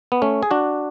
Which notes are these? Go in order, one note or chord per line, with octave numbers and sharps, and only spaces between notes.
B3
A3 C#4
G#4
D4 F#4